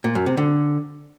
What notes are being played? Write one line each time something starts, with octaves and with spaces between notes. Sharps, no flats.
A#2
F#2
C3
D3